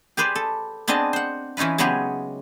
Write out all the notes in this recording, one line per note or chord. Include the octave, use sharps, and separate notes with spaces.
G4 G#4 B4 C5 D5
A4
B3 C4 D4 G#4 D#5 A5
C5 F#5
E3 C#4 D#4 F4 B4
C#3 F#3 G#3 B3 G4 G#4